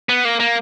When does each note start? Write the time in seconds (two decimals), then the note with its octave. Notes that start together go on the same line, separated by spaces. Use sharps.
0.09 B3
0.25 A#3
0.40 A#3